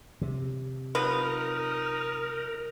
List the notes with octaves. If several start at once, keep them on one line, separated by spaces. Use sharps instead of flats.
C3
F3 F#3 D#4 A#4 B4